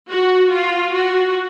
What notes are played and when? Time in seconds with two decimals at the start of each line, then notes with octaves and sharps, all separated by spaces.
0.09 F#4
0.52 F4
0.93 F#4